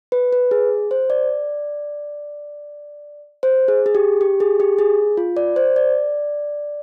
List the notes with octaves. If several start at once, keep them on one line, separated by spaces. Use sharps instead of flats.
B4
B4
G#4
C5
D5
C5
G#4
G#4
G4
G4
G#4
G4
G#4
F4
D5
C5
D5